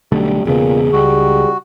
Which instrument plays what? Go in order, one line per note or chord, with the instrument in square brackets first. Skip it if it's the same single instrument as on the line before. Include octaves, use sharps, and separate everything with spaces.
[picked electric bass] B1 D3 A3 [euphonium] G3
[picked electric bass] E1 C#3 B3 [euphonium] A#2 [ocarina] G#4
[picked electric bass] C#2 [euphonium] G3 [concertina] F#4